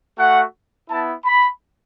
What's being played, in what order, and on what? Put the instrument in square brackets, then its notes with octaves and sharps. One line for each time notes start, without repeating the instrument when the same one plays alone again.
[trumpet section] A3 F#4 F#5
B3 E4 A5
B5